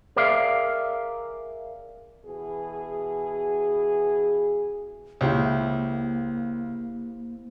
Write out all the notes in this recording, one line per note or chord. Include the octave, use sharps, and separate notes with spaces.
G#4 A#4 D5 E5 F5
B2 E3 G#4
C#2 A#3 E4 G4 C5